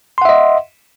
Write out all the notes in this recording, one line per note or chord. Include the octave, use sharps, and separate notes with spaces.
D#5 E5 F#5 C6